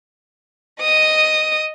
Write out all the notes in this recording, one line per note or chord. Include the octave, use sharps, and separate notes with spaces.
D#5 D#6